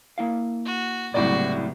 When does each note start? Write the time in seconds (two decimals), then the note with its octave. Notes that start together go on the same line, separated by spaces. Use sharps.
0.18 A#3 E4 F5
0.65 F#4
1.14 F#1 C2 A2 F#4 D5